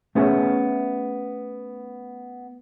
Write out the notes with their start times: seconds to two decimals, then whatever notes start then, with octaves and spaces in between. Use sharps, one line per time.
0.15 A3 B3 C#4 G#4 C#5 E5